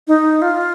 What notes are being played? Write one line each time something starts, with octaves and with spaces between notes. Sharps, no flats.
D#4
F4